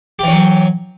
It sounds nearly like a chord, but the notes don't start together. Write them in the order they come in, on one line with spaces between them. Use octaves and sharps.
G4 E3 C#4 F#3